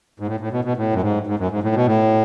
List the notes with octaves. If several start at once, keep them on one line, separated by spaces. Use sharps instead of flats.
G#2
A2
A2
B2
B2
A2
F#2
G#2
G#2
F#2
G#2
A2
B2
A2